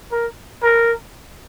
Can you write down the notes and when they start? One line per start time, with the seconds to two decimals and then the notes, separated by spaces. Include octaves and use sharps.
0.12 A#4
0.63 A#4